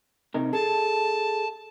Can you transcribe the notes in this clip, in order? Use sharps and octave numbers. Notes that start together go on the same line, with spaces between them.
C3 D#4 A#4
G#4 A4 A5